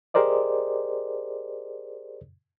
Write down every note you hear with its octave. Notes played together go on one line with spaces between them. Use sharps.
G4 G#4 A#4 C5 D5 D#5